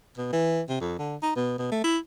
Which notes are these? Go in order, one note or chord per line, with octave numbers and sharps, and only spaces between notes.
B2
E3
C3
F2
D3
D#4
B2
B2
A3
E4